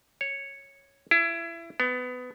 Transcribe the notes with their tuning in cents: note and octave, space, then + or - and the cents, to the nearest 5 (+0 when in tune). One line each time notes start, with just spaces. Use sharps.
C#5 -5
E4 +25
B3 +20